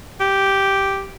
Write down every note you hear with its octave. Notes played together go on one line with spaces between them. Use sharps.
G4